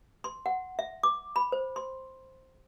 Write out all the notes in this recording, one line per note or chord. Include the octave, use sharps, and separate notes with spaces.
C6
F#5
E5
D6
B5
C5
C6